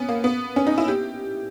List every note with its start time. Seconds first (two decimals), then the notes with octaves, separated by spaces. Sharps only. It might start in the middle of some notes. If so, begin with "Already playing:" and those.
Already playing: B3 C#4
0.09 A#3
0.24 B3
0.56 C#4
0.67 D#4
0.78 E4
0.88 G4